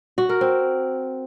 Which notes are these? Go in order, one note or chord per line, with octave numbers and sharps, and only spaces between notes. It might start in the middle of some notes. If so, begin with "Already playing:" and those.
F#4
A#4
C4